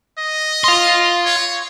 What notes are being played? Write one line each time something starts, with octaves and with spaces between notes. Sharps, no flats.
D#5
F5 C6
C#5